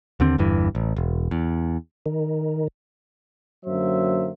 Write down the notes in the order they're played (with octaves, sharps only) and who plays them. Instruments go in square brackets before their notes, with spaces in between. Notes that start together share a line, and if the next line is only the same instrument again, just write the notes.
[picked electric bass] D#2 D3 C4
G1 E2 G2 E3
A1
E1
E2
[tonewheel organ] D#3
[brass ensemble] F#2 D3 F#3 A#3 C5 E5